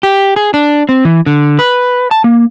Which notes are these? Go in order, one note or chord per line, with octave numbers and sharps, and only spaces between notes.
G4
G#4
D4
C4
E3
D3
B4
A5
A#3